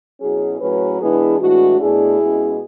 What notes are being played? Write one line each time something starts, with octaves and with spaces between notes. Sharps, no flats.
B2 F#3 C#4 E4 G#4
A2 F#3 C#4 G#4 B4
E3 G#3 B3 D4 E4 G#4
A2 E3 G#3 D4 F#4
B2 A3 D4 E4 G#4
B2 G#3 C#4